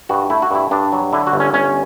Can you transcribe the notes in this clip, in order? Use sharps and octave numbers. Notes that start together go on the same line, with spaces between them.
G2 F#4
A3 E4
F#4
G2 E4
G2 D4
F#3
D3 E4
F#4
G1
C#4
G1 C#4